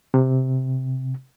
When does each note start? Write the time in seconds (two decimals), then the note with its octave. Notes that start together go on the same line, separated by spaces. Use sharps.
0.14 C3